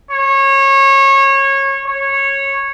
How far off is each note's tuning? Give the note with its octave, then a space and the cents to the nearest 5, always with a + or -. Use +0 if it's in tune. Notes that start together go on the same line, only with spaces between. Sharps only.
C#5 -25
C#5 -15